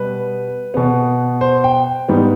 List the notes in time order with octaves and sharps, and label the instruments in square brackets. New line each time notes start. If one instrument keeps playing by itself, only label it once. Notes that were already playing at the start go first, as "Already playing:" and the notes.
Already playing: [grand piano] B2 G3 B3 B4
B2 B3
C5
G5
G#2 G3 B3